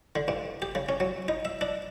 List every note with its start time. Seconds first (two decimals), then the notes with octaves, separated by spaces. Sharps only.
0.16 D3
0.28 G2
0.62 G4
0.75 C#3
0.89 C#4
1.00 F#3
1.28 D#4
1.45 E5
1.61 D4